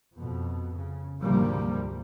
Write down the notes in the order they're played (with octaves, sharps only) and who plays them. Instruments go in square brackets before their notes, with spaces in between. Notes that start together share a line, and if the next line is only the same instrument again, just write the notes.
[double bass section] F2 B2
C#3
D2 G#2 C3 F3 G3 A#3